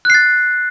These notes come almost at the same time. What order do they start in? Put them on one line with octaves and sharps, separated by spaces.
F#6 C7 A6